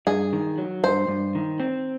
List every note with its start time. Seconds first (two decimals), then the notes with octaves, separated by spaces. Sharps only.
0.07 G2 G#4
0.33 D#3
0.58 F#3
0.84 G2 C5
1.08 G2
1.35 D#3
1.60 C4